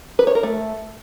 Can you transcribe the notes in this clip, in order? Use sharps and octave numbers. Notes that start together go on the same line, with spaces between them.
B4
C#5
A#4
A3